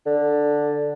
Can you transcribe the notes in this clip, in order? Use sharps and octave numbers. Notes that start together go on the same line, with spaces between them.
D3